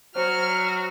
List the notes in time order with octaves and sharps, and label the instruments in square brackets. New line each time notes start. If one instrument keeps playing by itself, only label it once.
[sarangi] F#3 [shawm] F#4 [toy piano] C5 [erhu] F6